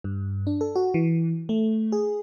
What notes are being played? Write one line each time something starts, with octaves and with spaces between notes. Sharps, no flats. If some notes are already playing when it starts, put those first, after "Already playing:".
G2
D4
A4
F#4
E3
A3
G#4